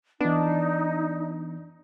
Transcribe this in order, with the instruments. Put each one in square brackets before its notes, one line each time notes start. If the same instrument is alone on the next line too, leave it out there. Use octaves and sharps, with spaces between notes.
[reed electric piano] E3 B3 [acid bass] D4 [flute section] D#4